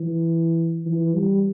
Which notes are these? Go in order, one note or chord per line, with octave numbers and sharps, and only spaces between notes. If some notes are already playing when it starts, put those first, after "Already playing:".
Already playing: E3
E3
G3